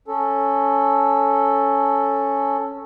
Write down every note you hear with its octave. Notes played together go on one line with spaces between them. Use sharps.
C#4 A4